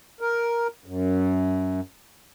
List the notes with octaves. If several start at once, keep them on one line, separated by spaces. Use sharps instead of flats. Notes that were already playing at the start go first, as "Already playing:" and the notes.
A#4
F#2